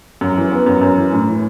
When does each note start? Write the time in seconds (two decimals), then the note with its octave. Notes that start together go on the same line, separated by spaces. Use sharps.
0.21 F#2
0.37 E3
0.51 B3
0.66 F#2
0.82 F#2
0.98 E3
1.13 A2
1.27 E3